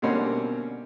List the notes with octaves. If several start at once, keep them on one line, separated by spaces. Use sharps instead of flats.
B2 D3 G3 A#3 C4 C#4